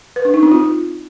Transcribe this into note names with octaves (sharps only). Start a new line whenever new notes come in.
B4
D4
D#4
C4
F4